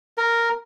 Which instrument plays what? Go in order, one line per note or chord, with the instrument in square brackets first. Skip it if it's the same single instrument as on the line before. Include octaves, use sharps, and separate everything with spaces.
[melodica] A#4